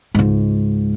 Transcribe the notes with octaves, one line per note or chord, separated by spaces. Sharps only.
C#2 G#2